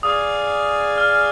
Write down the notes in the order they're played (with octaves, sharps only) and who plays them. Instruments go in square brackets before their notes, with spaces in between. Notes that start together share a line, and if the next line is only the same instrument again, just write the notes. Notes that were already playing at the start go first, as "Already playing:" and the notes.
[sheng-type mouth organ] G#4 D5 F5 G#5 [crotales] D#6
[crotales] F6